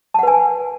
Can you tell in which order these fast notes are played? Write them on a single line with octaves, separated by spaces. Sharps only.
A5 F#5 B4 G#5